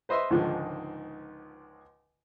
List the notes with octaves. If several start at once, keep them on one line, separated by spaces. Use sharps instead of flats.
B4 C5 D#5 E5 C6
C#2 G#2 D3 D#3 F3 G#3